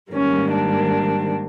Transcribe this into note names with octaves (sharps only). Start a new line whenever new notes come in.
G#2 D#3 G3 A#3 C#4
D4